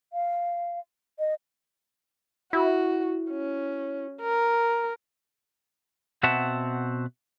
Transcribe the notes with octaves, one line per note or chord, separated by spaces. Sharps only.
F5
D#5
E4 F#4
C#4
A#4
B2 C4 F#4 E5 F#5 A5